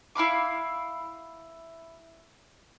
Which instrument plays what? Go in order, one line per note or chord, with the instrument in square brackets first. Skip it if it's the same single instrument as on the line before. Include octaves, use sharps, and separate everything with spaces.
[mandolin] E4 F5 B5 D6